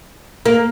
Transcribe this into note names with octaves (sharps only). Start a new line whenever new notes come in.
A#3